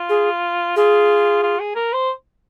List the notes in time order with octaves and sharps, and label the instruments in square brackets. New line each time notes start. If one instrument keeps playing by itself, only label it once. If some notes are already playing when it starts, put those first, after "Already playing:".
Already playing: [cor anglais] F4
[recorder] G#4
[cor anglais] F4 [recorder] G#4
[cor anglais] F4
G#4
A#4
C5